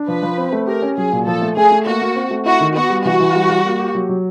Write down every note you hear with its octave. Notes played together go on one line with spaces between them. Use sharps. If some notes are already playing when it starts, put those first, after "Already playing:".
Already playing: D4
F3 B4
F3
C4
A3
G4 A#4
C#4
F#3 G#4
A#2
F3 A4
A3
A3 G#4
A3
A#3 F#4
A#3
C4
A3
E4 F#4
D#3
B3 F#4
G3
E3 F#4
E3
G3
G3
A#3
G4
F#3
F#3